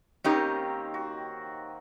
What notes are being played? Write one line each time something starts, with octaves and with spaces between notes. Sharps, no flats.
D#3 A#3 C4 C#4 D#4 G4
F#4